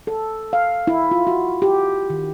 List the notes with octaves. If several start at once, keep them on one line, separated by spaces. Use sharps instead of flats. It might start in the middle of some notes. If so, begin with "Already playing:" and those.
A4
F5
E4
F4
F#4
G4
D#3